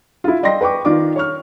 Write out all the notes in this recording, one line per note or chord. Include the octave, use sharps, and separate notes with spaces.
E4 F4
D5 D#5 G5 C6 A#6
B4 G5 C#6 D6
D#3 F4 D5 D6
C#5 C#6 F6